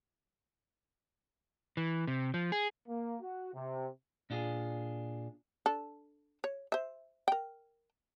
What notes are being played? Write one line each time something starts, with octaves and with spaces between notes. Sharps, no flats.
E3
C3
F3
G#4
A#3
F#4
C3
A#2 D4 F4 G4 G#4
D4 A4
C#5
C5 E5
A#4 G5